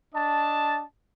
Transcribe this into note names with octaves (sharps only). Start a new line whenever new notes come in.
D4 D#5 A5